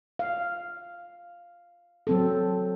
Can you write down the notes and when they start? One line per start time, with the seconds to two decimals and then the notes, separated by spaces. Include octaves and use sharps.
0.19 F5
2.07 F#3 C4 A4